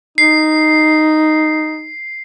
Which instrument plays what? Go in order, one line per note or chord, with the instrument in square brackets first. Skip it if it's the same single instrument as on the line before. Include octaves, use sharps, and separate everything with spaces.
[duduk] D#4 [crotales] C7